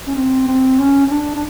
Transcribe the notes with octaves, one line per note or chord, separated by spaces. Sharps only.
C#4
C4
C4
C#4
C#4
D4
D4